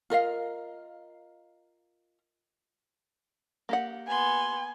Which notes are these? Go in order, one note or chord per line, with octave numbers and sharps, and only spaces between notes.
F4 A#4 D#5 F5
A#3 G4 F#5
B3 G#5 C6